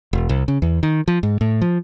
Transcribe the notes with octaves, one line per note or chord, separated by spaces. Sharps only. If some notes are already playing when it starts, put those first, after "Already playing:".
E1
C2
C#3
E2
D#3
F3
G#2
A2
F3